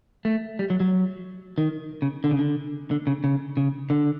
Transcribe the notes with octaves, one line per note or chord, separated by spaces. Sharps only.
A3
G3
F#3
F#3
D#3
C#3
D3
C#3
D3
D3
C#3
C#3
C#3
D3